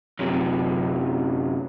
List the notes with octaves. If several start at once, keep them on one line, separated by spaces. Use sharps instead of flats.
F#2 C3